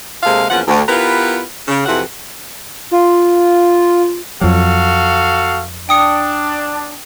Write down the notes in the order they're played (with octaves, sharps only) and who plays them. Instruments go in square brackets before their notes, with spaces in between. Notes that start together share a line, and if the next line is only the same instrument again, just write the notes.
[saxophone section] C3 G#3 A#3 G#4 A4 F5
E2 F3 A#3 C#4 F#5
D2
B3 E4 F4 G4 A#4 B4
C#3
F2 C3 E3 E4 F#4 F#5
[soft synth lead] F4
[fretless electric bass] F2 F#3 [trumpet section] F#4 A4 F5
[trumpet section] D4 [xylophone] G5 D#6 C#7